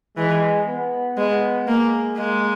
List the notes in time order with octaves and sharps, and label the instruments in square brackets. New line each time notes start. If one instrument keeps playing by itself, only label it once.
[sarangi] E3 [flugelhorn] G#3
[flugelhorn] B3
[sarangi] G#3 [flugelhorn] B3
[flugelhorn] G#3 [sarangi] A#3
[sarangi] G#3 [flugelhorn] A#3